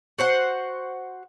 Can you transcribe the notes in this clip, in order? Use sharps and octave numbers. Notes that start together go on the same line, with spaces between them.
F#4 C5 F#5